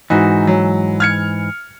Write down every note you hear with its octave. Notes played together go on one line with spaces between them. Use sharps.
G#2 E3 D#4 F#4
F#3
F6 G#6 C#7